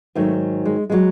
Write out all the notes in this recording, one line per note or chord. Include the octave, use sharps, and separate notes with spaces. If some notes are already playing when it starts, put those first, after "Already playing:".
G#2 D#3 F#3 A3
G#3
D#3 F#3 G#3